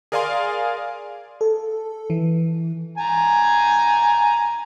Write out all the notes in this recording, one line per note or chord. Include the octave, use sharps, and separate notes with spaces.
G#4 A#4 D5 F5 G#5 C6
A4
E3
G#5 A#5